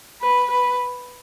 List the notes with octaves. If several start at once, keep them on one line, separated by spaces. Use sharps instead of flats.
B4
B4